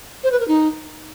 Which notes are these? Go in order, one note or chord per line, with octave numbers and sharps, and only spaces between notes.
C5
B4
A#4
D#4